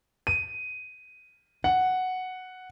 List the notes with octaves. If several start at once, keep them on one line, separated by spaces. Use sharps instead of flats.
D#7
F#5